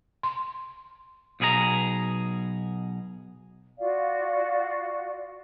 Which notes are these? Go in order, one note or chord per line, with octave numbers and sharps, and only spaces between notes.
C6
B1 B2 G#4 A#4 A#5
F4 F#4 D5 F5